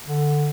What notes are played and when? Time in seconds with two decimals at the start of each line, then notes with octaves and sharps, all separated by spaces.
0.06 D3